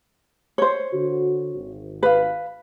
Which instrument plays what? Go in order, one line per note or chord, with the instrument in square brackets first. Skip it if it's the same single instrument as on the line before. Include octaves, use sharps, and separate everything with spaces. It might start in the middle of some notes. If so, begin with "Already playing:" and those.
[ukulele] C5 C#5
[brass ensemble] D3 F#4
G#1
[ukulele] B4 F5